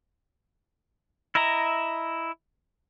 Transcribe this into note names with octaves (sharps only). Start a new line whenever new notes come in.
E4 D#5 E5 A#5